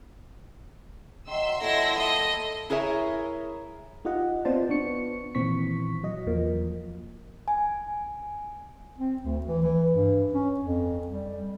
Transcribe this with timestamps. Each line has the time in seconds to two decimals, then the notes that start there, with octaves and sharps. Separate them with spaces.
1.27 D#3 F#3 E5 C6 E6
1.61 A#2 F#3 E4 A4 A#6
1.97 D#5
2.70 E4 G#4 A#4 C#5 E5
4.05 D#4 F4 G4 D#5 F#5
4.45 B3 C4 F4 C5 D5 A5
4.69 B3 D4 C#6 C#7
5.35 A#2 D#3 E3 C4 C#6 B6
6.03 F#3 D#5
6.27 E2 F3 A#3
7.48 G#5
8.98 C4
9.22 D2
9.46 E3
9.62 E3
9.92 G2
10.33 C#4
10.59 F2
11.07 G3